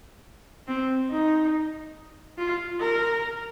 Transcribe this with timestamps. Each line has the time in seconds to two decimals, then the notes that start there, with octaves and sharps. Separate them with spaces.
0.67 C4
1.10 D#4
2.38 F4
2.80 A#4